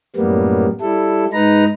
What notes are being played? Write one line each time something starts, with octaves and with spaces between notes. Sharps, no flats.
F#2 A2 G3 A#3 B3
G3 E4 A4
G#2 D#4 B4 A#5